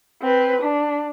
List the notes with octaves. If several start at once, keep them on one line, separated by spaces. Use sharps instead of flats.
C4 B4
D4